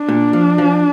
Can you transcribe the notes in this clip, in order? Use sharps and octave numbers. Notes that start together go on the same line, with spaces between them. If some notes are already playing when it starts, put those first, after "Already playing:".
Already playing: D4
A#2
F3
F3